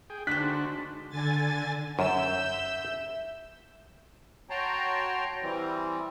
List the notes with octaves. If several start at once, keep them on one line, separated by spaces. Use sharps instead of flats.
G#4 G5
D3 G#3 D4 D#4 F#4 C5 F#6 B6
D3 G#5 A6
F#2 E5 E6 G6
F#4 C#5 G5 A5 A#5 C6
E3 G3 C4